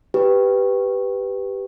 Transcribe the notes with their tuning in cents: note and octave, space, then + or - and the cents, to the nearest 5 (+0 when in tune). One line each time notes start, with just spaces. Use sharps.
G4 +0 B4 +0